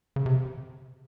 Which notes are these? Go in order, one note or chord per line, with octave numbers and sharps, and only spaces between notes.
C#3
C3